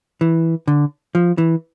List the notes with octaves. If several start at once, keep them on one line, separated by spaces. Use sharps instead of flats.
E3
D3
F3
E3